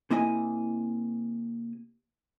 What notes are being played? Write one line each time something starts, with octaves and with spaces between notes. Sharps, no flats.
C3 A#3 E4 D#5 G#5